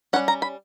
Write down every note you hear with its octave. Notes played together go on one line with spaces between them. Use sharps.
G3 C#4 F#5
A#5
B5